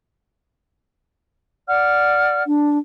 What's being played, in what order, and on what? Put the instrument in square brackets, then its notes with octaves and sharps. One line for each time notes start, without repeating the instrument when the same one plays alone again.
[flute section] D5 F#5 F6
[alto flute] D4